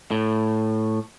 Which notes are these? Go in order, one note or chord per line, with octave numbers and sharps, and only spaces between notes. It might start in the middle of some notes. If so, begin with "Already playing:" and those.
A2